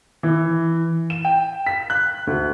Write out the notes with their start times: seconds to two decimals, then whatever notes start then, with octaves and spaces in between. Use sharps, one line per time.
0.23 E3
1.10 E7
1.25 G5
1.67 B6
1.90 F#6
2.27 D2